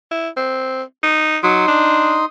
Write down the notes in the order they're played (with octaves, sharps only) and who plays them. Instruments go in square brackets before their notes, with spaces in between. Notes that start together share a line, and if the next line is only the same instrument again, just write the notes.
[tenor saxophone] E4
C4
D#4
[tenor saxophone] F#3 [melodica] D#4 C6 D#6
[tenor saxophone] D4